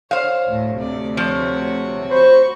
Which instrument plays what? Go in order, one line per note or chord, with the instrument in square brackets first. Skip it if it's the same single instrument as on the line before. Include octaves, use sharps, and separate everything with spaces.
[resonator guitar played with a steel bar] C5 F5 [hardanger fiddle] C#5
[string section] D2 A2
[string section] D2 C3 [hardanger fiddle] D5
[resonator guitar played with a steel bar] F3 [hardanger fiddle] F#4 C#5
[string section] F#4 [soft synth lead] C5 [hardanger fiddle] B5 C#6